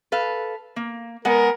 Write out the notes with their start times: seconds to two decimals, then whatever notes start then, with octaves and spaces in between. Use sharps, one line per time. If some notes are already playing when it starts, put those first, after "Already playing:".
0.12 A4 B4 F5
0.76 A#3
1.25 G#3 B3 A#4 F#5